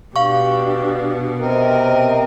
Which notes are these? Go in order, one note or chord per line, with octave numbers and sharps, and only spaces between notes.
B2 D4 G4 F5 C#6
C3 B3 C4 A#4 D#5